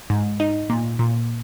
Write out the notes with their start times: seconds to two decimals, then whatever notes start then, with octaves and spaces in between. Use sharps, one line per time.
0.10 G#2
0.40 D#4
0.70 A#2
0.99 A#2